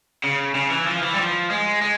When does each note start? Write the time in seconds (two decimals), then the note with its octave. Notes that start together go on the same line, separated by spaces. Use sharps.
0.24 C#3
0.55 C#3
0.70 E3
0.87 F3
1.02 E3
1.13 G3
1.18 F3
1.50 G#3
1.82 G#3